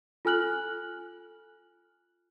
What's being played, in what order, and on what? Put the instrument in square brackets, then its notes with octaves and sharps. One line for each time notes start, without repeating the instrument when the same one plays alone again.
[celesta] F4 A4 G#5 F6 F#6 F#7